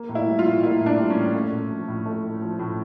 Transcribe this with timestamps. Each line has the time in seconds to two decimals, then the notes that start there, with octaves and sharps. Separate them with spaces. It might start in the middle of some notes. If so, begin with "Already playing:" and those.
Already playing: A#3
0.09 A2
0.15 E4
0.27 G3
0.39 F4
0.46 A2
0.63 A#3 E4
0.81 A2
0.86 D4
0.99 G3
1.10 C#4
1.16 A2
1.34 A3
1.52 A2
1.70 F3
1.88 A2
2.06 A3
2.24 A2
2.42 F3
2.59 A2